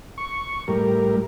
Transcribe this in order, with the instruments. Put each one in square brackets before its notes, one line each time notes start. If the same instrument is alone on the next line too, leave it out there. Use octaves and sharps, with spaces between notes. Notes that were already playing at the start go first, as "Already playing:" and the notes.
[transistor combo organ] C#6
A2 G3 A#4